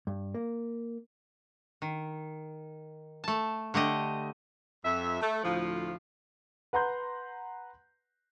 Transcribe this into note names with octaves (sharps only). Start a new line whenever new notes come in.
G2
A#3
D#3
A3 A5
D3 A3 G4 D#5
F2 E5
A3
D2 A2 F3
B4 F#5 A#5 C6 G6